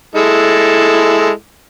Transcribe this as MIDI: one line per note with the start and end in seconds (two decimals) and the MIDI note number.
0.15 1.30 56
0.15 1.30 64
0.15 1.30 69